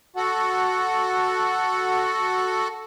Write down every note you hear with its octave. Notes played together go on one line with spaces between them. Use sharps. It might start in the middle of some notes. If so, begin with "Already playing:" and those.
F#4 A4 F#5